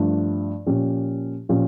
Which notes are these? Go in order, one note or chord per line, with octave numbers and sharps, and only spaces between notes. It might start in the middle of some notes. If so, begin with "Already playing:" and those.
Already playing: G2 F3 A3 D4
A#2 F3 C#4 G4
A#2 F3 C#4 G4